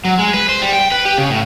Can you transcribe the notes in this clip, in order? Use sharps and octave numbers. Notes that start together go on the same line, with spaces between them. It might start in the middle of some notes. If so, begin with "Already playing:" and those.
F#3
G#3
B4
C5
G3
G5
B4
G4
C#3
A2